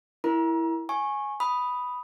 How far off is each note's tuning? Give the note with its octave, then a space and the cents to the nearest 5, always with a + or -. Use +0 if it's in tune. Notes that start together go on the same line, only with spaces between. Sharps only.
E4 +0 A#4 +0 A#5 +35
G#5 +10 C#6 -20
B5 +0 D#6 +0